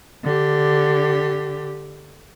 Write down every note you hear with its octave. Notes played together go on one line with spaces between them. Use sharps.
D3 G4